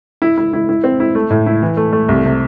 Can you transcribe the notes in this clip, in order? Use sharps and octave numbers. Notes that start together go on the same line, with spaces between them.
E4
E4
E4
E4
C4
E4
A3
A2
E4
E3
A3
A3
C2
C3